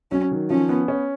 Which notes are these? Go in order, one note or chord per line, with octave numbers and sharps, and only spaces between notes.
F#3 C#4
D#3
F3 C#4
B3
C#4